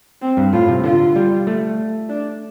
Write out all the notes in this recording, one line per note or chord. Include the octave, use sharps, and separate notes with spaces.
C4
G2
A2 F4
C3
D3 F4
G3
A3
D4